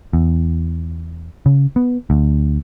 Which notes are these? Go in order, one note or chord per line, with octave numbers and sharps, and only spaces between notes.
E2
C#3
B3
D2